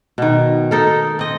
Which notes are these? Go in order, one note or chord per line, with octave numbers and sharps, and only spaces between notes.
B2 D#3
D#4 A4 A#4
C4 D#5